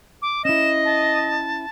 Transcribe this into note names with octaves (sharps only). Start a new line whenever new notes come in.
D6
C#4 E4 D#5 E7
A5